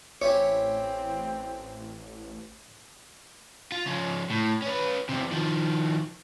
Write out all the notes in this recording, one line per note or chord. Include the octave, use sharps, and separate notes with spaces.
A1 C4 C#4 E4 G4 C#5
F4
C#3 F3
A2
C#4 B4
E2 C3
D#3 F3